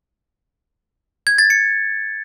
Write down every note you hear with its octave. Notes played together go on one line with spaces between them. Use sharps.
G#6
A6
C#7